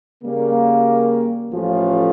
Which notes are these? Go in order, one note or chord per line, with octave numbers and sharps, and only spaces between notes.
C#3 G3 A#3
A1 A2 F3 C#4 F4